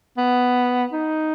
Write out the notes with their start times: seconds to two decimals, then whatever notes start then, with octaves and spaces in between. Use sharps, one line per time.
0.17 B3
0.92 D#4